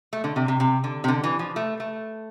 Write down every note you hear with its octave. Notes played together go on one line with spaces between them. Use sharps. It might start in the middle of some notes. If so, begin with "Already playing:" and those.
A3
D3
C3
C3
C3
D3
C3
D3
E3
F3
A3
A3